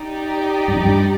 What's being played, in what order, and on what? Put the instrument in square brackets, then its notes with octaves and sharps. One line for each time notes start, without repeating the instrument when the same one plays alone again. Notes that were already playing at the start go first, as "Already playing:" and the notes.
Already playing: [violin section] D#4 G4 D5
[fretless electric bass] G2
F2
G2